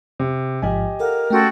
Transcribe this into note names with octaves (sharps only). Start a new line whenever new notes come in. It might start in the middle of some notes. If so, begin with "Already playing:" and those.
C3
A1 G#2 F3 G4 D#5 G#5
A4 A#4 F5 F#5
A3 C#4 F#4 A4 G5 C6